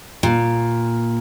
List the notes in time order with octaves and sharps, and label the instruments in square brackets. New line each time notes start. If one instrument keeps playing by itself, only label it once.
[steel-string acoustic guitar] A#2